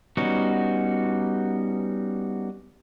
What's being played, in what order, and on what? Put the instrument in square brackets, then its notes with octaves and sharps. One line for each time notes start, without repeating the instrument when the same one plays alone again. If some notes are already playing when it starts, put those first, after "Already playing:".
[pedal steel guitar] G3 B3 C#4 D#4 F#4